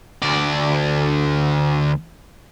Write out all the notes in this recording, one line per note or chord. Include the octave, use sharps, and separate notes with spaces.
D2 D5